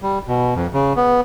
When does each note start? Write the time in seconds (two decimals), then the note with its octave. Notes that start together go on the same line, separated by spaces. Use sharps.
0.02 G3
0.28 B2
0.55 F2
0.74 C#3
0.96 B3